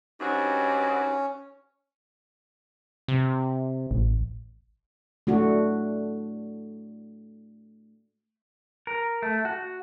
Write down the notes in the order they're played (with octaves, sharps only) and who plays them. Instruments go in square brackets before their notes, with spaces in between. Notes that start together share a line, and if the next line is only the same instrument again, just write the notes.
[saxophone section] G2 C4 F#4 [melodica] C#4 [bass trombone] D#4
[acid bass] C3
[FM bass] A1
[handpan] A3 D4 F#4
[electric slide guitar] A#4
A3
F#4